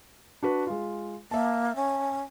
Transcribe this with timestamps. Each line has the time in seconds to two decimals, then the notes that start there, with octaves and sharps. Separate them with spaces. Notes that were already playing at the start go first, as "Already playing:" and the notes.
0.43 D4 F#4 B4
0.67 G#3 F4
1.31 A#3 E5 A5
1.76 C#4